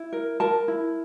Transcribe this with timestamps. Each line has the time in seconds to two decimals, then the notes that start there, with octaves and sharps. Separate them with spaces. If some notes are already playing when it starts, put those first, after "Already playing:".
Already playing: E4
0.13 A#4
0.40 A#4 A5
0.68 E4